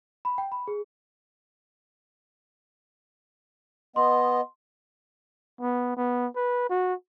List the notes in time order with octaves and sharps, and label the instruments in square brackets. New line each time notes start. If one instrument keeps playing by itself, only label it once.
[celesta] B5
G5
B5
G#4
[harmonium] B3 D#5 [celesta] C6
[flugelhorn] B3
B3
B4
F#4